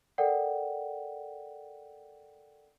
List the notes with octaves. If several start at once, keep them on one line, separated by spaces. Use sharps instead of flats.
A4 A#4 D5 F#5 G5